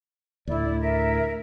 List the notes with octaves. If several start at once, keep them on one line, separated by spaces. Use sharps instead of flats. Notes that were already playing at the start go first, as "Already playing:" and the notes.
D2 A2 E4 D5
A#4 E5